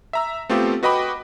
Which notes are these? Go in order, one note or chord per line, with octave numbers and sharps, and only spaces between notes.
E5 A#5 E6
A3 B3 C4 F4 G4 A4
F#4 B4 D#5 G5 B5 D6